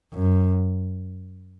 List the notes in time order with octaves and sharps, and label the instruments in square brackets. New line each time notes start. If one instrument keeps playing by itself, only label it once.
[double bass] F#2